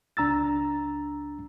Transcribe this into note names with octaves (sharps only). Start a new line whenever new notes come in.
C#2 D4 A#5 E6 A6